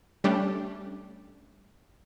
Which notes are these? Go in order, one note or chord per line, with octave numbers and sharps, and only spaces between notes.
G3 A3 C#4 D4 G4